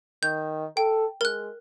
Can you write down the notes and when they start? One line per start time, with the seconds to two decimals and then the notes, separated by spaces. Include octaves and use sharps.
0.23 D#3 G6
0.77 A4 G5
1.21 G#3 A#4 F#6